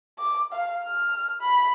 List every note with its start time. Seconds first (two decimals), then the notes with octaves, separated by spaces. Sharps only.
0.19 D6
0.52 F5
0.84 F6
1.41 B5